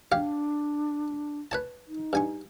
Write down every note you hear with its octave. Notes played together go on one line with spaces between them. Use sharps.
D4 G4 C#5 F5
B4 C#5 A5
D#4
G2 G#5 C#6